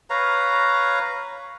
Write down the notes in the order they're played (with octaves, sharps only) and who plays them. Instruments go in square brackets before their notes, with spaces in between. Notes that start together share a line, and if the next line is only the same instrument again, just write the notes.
[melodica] B4 C#5 F5 A#5